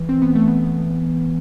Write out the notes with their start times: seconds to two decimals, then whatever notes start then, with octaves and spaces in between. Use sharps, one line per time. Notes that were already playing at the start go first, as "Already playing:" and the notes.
Already playing: E3
0.09 C4
0.22 B3
0.35 A3
0.48 B3